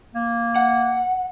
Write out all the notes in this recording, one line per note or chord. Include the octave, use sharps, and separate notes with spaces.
A#3
F#5